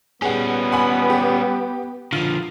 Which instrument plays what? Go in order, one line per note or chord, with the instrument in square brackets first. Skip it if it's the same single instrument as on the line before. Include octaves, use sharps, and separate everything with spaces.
[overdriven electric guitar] G3 C#4 [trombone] B3 [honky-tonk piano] G#4 F#5
[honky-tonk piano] F#5 G#5 B5
G4
[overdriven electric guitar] D3 F3 [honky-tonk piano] F4